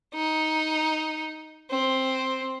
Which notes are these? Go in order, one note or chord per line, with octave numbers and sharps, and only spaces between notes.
D#4
C4